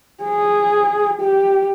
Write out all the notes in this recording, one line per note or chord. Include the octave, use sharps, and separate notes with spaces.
G#4
G4